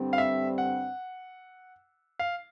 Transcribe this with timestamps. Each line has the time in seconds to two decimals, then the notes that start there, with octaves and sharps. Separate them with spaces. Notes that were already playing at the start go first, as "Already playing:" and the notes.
Already playing: G2 D3 G3 C4
0.13 F5
0.18 E5
0.58 F#5
2.19 F5